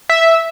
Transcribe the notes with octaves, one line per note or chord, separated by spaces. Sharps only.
E5